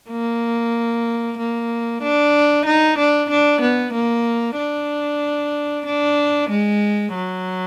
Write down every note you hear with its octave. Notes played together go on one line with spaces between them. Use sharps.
A#3
A#3
D4
D#4
D4
D4
B3
A#3
D4
D4
G#3
F#3